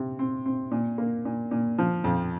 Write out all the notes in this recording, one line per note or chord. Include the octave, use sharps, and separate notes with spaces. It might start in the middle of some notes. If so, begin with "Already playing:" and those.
Already playing: C3
C4
C4
A#2
A#3
A#2
A#2
F3
F2